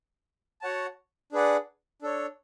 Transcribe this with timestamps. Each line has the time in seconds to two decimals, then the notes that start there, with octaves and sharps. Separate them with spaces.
0.61 F#4 C#5 F#5 A5
1.32 D4 G#4 B4 D5 F#5
2.02 D4 A4 C#5